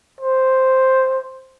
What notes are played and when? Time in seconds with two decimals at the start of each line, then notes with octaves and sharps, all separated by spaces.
0.21 C5